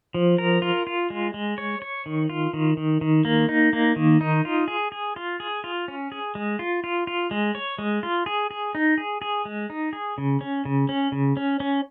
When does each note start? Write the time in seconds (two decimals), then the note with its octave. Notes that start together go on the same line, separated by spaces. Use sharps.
0.14 F3
0.38 A#4
0.62 F4
0.87 F4
1.10 G#3
1.34 G#3
1.58 C#5
1.82 C#5
2.06 D#3
2.30 F4
2.54 D#3
2.77 D#3
3.01 D#3
3.25 A#3
3.49 D#4
3.73 A#3
3.96 D#3
4.21 D#4
4.45 F4
4.68 G#4
4.92 G#4
5.16 F4
5.40 G#4
5.64 F4
5.88 C#4
6.12 G#4
6.35 G#3
6.59 F4
6.84 F4
7.07 F4
7.31 G#3
7.55 C#5
7.79 G#3
8.03 F4
8.26 G#4
8.51 G#4
8.75 D#4
8.98 G#4
9.22 G#4
9.45 G#3
9.70 D#4
9.93 G#4
10.18 C#3
10.41 C#4
10.65 C#3
10.89 C#4
11.12 C#3
11.37 C#4
11.60 C#4